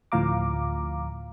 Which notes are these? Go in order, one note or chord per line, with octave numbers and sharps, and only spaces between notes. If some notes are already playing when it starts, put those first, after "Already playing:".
D2 A2 F3 F5 A#5 D6